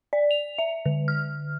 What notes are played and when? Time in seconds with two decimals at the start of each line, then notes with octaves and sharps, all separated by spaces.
0.13 D5
0.31 F7
0.58 E5
0.86 D3
1.08 F6